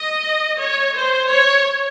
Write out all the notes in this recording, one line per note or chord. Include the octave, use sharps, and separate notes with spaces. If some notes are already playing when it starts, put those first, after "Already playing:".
Already playing: D#5
C#5
C5
C#5